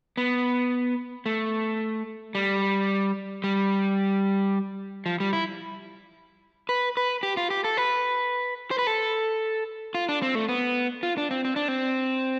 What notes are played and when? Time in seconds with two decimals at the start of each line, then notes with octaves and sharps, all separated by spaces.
0.17 B3
1.26 A3
2.35 G3
3.44 G3
5.06 F3
5.20 G3
5.33 E4
6.69 B4
6.97 B4
7.23 G4
7.37 F4
7.50 G4
7.64 A4
7.77 B4
8.71 C5
8.79 B4
8.87 A4
9.94 F4
10.09 D4
10.22 C4
10.35 A3
10.49 B3
11.03 F4
11.18 D4
11.31 C4
11.45 C4
11.56 D4
11.68 C4